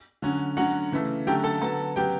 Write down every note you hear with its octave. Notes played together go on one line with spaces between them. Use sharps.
D3 F#3 C#4
D3 F#3 C#4 F#4 F#5
C#3 E3 A3
D3 F#3 A3 C#4 G4 G5
A4 A5
D3 F#3 B3 A4 A5
C#3 F#3 B3 G4 G5